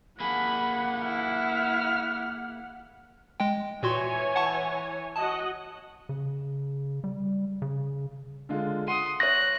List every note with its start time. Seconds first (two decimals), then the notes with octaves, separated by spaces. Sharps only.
0.20 A#3 G#4 F#5 B5
1.04 E4 F6
3.40 G#3 G5
3.83 A#2 E3 F#4 C#5 G#5 C6
4.36 F#5 A5 C#6
5.17 F#4 D#5 F#5 A5
6.09 C#3
7.04 G3
7.62 C#3
8.49 D3 G#3 F4
8.87 F#5 C6 D#6 D#7
9.20 C#5 E5 C#6 F#6 A#6